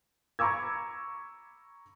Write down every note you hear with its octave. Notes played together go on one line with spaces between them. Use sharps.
A#5 B5 C#6 D6 E6 G#6